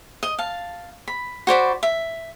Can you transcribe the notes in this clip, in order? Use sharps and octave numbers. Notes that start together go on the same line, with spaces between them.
D#5
F5 A5
B5
F#4 C5 D5 B5
E5